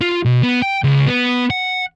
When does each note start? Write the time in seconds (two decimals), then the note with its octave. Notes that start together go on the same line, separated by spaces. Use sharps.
0.01 F4
0.25 B2
0.43 B3
0.62 G5
0.84 C#2
1.07 B3
1.50 F#5